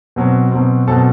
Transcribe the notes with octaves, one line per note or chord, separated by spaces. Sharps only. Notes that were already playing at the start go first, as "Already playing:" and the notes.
B2 F#3 C4
B2 F#3 C4
B2 F#3 C4 A4 A5